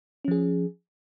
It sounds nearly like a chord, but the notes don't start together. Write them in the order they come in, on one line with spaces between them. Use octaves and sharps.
C#4 F3 G#4